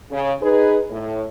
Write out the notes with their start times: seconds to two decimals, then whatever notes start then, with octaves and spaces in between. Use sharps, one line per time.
0.11 C#3
0.42 D#4 G#4 B4
0.91 A2